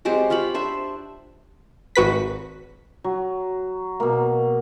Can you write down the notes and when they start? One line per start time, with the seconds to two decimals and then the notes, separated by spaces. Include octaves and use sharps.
0.05 F#3 G#3 C4 G4
0.30 F4 G4 C#5 B5
0.54 D4 C5 E5
1.96 G#1 F#4 B4 B6
3.04 F#3
4.00 B2 A#3